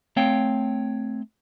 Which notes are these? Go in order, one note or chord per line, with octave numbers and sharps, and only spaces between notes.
A3 C4 C#5 F5 G5